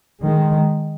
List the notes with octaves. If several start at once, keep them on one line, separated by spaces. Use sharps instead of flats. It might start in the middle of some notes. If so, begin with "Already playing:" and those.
D#3 G#3